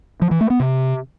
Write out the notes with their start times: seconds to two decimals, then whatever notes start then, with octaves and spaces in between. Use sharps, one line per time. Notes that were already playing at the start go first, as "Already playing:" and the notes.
0.22 F3
0.31 E3
0.41 A3
0.50 B3
0.60 C3